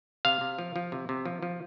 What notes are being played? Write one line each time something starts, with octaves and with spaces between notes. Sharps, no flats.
C3 F5
C3
F3
F3
C3
C3
F3
F3